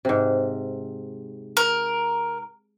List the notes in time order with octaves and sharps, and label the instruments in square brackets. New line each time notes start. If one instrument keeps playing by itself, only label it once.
[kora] G#2 C3
[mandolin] A#4